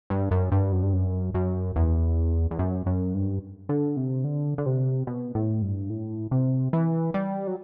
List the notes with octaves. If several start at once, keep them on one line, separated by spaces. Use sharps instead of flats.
G2
F#2
G2
F#2
G2
F#2
F#2
E2
E2
F#2
F#2
G2
D3
C3
D3
D3
C3
B2
A2
G2
A2
C3
E3
G3
F#3